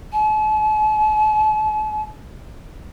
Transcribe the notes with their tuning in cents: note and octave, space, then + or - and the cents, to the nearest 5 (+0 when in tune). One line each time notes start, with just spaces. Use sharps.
A5 -45